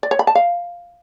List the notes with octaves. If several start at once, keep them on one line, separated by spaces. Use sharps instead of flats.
D5
C#5
B5
A5
F5